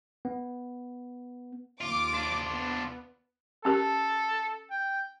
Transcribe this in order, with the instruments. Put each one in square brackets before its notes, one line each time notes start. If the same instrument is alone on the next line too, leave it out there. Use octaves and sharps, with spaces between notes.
[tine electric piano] B3
[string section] D#2 D6 [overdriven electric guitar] F4
[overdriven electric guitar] D4 F4
[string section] B3
[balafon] C#4 G4 A#4 [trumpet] A4
[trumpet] G5